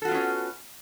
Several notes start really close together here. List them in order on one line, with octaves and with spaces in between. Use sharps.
A4 F#4 F4 B3 C#4